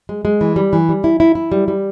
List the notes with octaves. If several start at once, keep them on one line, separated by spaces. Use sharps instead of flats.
G#3
G#3
E3
G3
E3
G3
E4
E4
E4
G3
G3